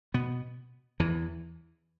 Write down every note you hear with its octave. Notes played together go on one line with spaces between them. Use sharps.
B2 B3
E2 E3